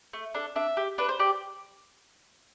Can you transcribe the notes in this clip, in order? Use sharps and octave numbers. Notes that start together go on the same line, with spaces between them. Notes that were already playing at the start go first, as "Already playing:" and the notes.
A3
D4 A4
D4 E5
G4
D4 B4
C5
G4 D5